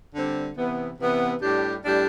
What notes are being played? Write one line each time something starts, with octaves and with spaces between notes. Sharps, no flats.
D3 G3 C4
C3 E3 B3
C3 E3 B3
A2 G3 D4 G4
A2 G3 D4 G4